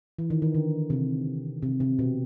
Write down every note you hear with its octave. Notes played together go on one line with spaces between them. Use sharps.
E3
D#3
D#3
D3
C3
C3
C3
B2